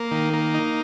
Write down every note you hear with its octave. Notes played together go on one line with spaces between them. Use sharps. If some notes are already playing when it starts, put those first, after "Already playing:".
Already playing: A#3
D#3
A#3
D#4